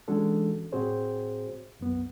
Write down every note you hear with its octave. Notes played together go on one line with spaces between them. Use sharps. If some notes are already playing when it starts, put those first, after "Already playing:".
E3 G#3 C#4 D4 F#4 A4
A2 C4 F#4 G#4 C5 C#5
C2 F#2 B3